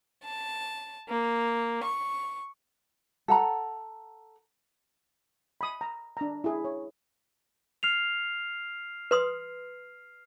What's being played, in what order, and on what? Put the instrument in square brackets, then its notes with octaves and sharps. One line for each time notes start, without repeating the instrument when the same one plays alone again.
[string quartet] A5
A#3
C#6
[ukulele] A4 F#5 A#5
[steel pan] B5 D#6
A#5
D4 A#5
E4 G#4
C#5
[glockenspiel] F6 C7 F7
[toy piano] B4 C6 D#6